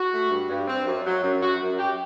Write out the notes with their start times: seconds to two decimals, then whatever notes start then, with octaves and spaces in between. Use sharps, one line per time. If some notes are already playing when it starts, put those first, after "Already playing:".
Already playing: F#4
0.12 A3
0.30 G2
0.49 G2
0.68 C4
0.86 F#2
1.06 F#3
1.23 F#2
1.42 F#2 F#4
1.61 F#2
1.79 F#2 G4